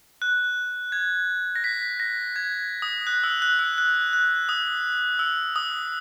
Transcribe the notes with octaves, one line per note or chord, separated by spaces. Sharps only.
F#6
G#6
A#6
B6
A#6
G#6
D#6
F#6
E6
F#6
E6
F#6
F#6
D#6
E6
D#6